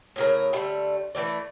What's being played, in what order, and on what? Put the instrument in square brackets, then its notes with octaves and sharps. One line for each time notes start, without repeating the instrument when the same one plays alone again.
[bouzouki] A2 C#3 A#4
D3 G3 A3
E3 A3 D5